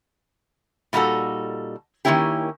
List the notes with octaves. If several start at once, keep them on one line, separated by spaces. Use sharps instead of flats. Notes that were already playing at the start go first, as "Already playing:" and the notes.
A#2 G3 D#4 F#4 A4
D#3 E3 A#3 C#4 E4 G4